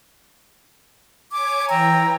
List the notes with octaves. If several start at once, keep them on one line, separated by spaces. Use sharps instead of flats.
C#5 G#5 D6 G#6
E3 G5 A#5 E6